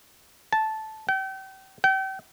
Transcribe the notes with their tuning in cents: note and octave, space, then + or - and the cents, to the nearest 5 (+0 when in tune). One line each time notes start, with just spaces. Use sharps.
A5 -10
G5 -35
G5 -35